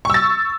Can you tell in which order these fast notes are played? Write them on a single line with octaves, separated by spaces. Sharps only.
C#6 E6 A6